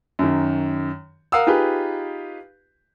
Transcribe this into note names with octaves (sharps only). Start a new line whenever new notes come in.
F#2 D#3
A#4 F5 F#5 D#6 E6
D#4 F4 G4 G#4 B4